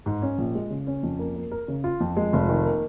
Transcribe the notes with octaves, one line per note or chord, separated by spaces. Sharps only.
G#2
C#4
A#1
G#3
C#3
C#4
F2
A#3
A#3
A#4
C#3
F4
F2
G#3
F1
D#3
A#3